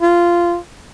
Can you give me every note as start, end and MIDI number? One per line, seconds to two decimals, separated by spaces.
0.02 0.57 65